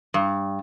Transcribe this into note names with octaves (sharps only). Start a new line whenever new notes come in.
G2